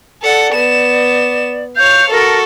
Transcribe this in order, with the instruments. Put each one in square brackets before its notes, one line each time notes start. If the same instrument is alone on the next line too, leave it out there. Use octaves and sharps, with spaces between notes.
[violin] A4 F#5 [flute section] D5
[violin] B3 E7
[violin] C#5 F5 [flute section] G6
[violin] F#4 A4 [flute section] A#4 A5